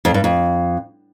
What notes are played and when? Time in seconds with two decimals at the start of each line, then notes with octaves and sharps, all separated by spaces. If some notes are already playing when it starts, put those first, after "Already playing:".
0.05 F2
0.14 G2
0.24 F2